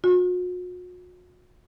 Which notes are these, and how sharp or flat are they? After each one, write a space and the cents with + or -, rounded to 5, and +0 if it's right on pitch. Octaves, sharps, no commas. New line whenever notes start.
F#4 -45